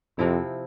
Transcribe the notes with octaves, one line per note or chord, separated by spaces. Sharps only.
F2 C3 F3 C4 E4